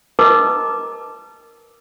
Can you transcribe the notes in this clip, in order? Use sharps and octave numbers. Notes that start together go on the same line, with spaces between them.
A#4 B4 D#5 A5 A#5 D6